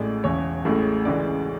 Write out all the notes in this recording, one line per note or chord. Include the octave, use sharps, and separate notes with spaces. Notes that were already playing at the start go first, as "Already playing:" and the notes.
Already playing: A1 A2 G#3 D5
E1 E2 C#3 C#5
A1 A2 G#3
D2 C#3 E3 G#3 D5